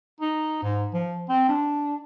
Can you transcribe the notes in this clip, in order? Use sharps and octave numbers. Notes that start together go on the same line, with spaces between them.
D#4
G#2
F3
C4
D4